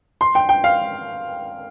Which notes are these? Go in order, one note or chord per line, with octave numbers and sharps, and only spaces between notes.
C6
G5
G5
F5